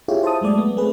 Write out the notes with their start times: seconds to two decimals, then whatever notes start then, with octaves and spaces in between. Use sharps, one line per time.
0.08 E4 F4 G4 G#4 C#5
0.23 C5 E5 A5 D#6
0.41 F#3 G#3 A3 D5
0.58 B3
0.77 A3 C4 G#4 B4